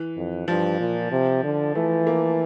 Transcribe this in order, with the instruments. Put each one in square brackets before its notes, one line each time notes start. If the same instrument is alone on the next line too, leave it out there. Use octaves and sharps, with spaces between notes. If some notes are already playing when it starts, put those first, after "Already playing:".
Already playing: [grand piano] E3
[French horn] F2
[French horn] G2 [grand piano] F3
[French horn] A#2
C3
D3
[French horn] E3 [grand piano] A3
[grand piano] A#3